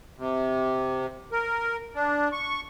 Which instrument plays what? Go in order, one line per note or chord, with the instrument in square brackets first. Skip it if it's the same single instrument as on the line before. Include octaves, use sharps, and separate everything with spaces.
[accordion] C3
A#4
D4
C#6